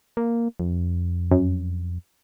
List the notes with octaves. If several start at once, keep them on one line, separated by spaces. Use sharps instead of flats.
A#3
F2
F#2